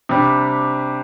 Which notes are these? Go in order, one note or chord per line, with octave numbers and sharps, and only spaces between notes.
C3 G3 D4